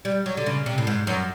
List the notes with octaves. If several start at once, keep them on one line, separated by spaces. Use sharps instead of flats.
G3
F#3
D3
C#3
C3
A2
G#2
F#2